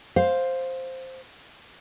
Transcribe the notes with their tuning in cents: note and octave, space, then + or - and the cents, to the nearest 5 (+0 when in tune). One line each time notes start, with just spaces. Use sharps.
C5 +0 F5 +10